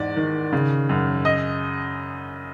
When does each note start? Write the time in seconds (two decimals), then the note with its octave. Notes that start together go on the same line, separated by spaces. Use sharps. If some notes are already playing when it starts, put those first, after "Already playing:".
Already playing: E2 G#2 D5
0.16 D#3
0.53 C#3
0.89 F#2
1.25 D#5